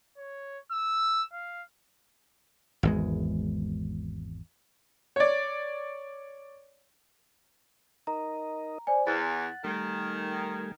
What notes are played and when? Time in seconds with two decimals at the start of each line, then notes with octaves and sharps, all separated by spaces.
0.17 C#5
0.71 E6
1.32 F5
2.83 G#1 E2 G#3
5.16 C#5 D5
8.07 D#4 A#4 D#5 A#5
8.87 C5 D5 G#5
9.07 E2 F#5 A6
9.65 D#3 G3 A3 G#5